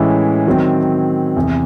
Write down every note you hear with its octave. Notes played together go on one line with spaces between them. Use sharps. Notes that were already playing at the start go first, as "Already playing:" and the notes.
Already playing: A2 E3 G#3 C#4 E4
D#3 F#3 C4
E2 C3 E3